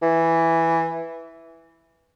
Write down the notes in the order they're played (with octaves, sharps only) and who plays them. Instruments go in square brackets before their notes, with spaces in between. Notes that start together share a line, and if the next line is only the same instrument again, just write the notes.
[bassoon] E3